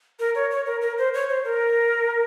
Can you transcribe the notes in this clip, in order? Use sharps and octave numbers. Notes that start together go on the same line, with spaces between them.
A#4
C#5
C#5
A#4
A#4
C5
C#5
C5
A#4